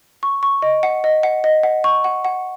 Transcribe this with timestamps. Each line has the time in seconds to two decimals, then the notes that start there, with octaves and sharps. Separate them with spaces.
0.23 C#6
0.43 C#6
0.62 D#5
0.83 F#5
1.04 D#5
1.23 F#5
1.44 D#5
1.63 F#5
1.84 C#6
2.04 F#5
2.25 F#5